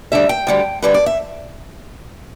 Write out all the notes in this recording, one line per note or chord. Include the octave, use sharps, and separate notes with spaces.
D2 D3 G3 E5
G5
D2 D3 G3
D2 D3 G3 B4
D5
E5